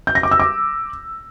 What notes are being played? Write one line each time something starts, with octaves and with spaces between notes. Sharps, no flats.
G6
A#6
D6
E6
D6